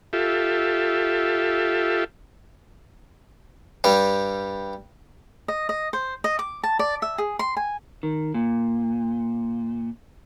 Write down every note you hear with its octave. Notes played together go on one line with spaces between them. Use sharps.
F4 G4 A4 E5
G2 G3
D#5
D#5
C5
D#5
D6
A5
D5
E5
G#4
C6
G#5
D#3
A#2